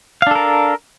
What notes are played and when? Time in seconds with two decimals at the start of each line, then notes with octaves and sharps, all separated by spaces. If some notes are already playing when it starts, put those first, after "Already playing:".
0.22 F5
0.27 D4
0.31 A4
0.35 A#4